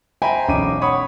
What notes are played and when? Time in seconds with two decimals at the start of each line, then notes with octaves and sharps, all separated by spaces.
0.22 C5 E5 G5 G#5 A#5 B5
0.48 E1 B1 C#4 D#5 D6 D#7
0.81 C#5 F#5 B5 C#6 D#6